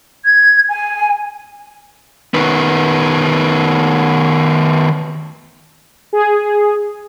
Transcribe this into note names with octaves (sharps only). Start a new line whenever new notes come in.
G#6
G#5
D#3 B3
G#4